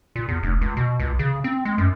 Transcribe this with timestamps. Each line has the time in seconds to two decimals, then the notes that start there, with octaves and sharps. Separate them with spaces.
0.16 A#2
0.29 E2
0.43 F1
0.61 C#2
0.77 B2
1.00 C#2
1.19 C#3
1.44 C4
1.65 G#3
1.78 F#2